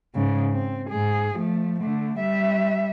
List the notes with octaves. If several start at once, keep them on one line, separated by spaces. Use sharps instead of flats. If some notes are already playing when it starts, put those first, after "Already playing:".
G#2 C#3
C4
G#2 G#4
F3 A3
D3 A3
G3 E5